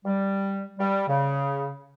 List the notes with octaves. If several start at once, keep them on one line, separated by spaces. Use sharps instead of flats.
G3
G3
C#3